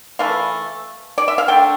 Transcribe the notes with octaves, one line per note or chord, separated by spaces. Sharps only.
E3 A3 F5
D5
E5
F5
D3 A3 G5